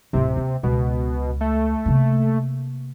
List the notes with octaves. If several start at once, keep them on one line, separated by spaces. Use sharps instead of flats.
D1 A2 C3
A#3
C#2 B2
A3
C3 A#3